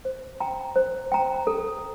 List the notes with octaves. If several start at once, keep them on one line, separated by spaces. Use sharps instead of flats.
C5
G5 A#5
C5
G5 A#5
A4